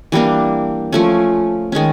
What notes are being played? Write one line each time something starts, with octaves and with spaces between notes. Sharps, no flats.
E3 G3 A#3 D4
F3 A3 C#4
D#3 G#3 C#4